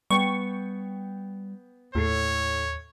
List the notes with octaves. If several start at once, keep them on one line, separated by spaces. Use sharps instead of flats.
G3 B3 G5 C#6
D#2 A2 A4 C#5 C7